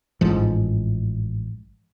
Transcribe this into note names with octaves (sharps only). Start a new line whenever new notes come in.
A1 G#2 F3